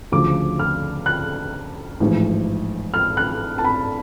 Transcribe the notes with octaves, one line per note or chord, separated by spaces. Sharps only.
D2 C#3 F3 D6
F6
F#6
A1 G#2 F3
F6
F#6
A5
B5